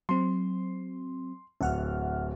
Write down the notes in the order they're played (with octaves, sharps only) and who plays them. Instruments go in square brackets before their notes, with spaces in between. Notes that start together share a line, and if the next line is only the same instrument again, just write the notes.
[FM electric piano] F#3 C4 [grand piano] C6
[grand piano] D1 [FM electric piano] E5 F#5 F6